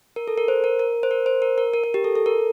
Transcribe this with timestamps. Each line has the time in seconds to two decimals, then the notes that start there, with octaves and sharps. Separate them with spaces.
0.16 A#4
0.28 A4
0.38 A#4
0.48 C5
0.64 A#4
0.79 A#4
1.03 C5
1.11 A#4
1.26 C5
1.42 A#4
1.58 A#4
1.73 A#4
1.84 A#4
1.94 G4
2.04 A4
2.15 A4
2.26 A#4